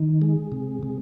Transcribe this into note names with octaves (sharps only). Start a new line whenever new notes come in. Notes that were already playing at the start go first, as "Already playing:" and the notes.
Already playing: D#3
G#3
C3
C3